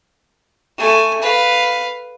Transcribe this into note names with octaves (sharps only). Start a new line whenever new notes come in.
A3 G#5
B4 F5